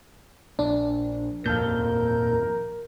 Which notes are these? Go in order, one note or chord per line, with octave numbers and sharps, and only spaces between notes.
A#1 D4
D#1 G#1 F2 A#2 A4 A#4 F5 G6